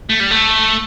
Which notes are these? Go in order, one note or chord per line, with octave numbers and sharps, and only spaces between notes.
A3
G3
A3